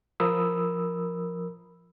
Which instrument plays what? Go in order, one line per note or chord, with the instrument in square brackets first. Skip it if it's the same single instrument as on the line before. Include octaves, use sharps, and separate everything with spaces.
[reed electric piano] F3 A#4 B5 D#6 E6